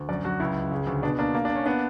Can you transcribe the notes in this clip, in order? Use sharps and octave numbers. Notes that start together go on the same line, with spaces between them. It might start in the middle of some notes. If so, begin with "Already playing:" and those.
Already playing: D2
F#2 D5
F#2 F#4
C#2 E4
C#2
C#3
D2
B2 D4
A#3 D4
A#3
D4
A#3
C#4
B3 D4